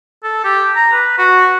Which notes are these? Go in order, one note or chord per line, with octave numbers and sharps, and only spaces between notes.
A4
G4
A#5
B4
F#4